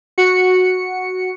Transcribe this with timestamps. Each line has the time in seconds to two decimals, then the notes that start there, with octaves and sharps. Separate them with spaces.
0.18 F#4 C#7